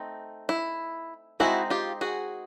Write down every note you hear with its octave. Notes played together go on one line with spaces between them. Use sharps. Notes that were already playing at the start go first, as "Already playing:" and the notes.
Already playing: A3 C4 D#4
E4
G#3 C4 D#4 E4 F#4
F4 G4
F#4 G#4